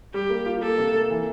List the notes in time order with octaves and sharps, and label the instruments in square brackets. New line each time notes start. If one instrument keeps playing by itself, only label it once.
[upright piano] G3 [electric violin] G4
[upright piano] A#3
F4
[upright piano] A#3 [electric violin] A4
[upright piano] C3
A#3
E3